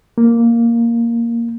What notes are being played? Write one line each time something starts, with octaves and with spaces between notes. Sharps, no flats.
A#3